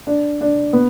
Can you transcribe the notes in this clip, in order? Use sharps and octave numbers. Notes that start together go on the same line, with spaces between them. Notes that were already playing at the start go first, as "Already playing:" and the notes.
D4
D4
B3